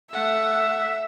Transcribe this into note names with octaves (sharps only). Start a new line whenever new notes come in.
A3 E5 F#5